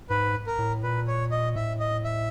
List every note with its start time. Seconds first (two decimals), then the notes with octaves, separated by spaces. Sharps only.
0.10 G#2 B4
0.47 A#4
0.59 A2
0.83 A#2 B4
1.07 C#5
1.31 D#5
1.56 A2 E5
1.80 D#5
2.05 E5